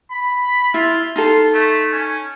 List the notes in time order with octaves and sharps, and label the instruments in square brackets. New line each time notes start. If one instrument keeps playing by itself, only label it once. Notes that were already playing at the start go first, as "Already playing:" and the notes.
[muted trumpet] B5
[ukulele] E4 [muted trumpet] F4
[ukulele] D#4 A4 [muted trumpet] F4
[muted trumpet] A3
C#4